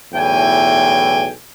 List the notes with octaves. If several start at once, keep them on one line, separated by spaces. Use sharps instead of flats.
B1 E2 A2 G5 G#5